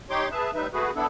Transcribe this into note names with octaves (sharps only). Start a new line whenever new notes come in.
D#4 G4 C#5 C6 D6
G#4 B4 E5 A5
A2 G3 D#4 B4 E5
A3 F#4 G#4 B4
B3 D4 E4 A4